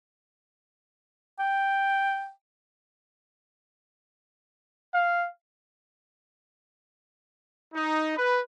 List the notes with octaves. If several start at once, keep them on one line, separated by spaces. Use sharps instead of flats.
G5
F5
D#4
B4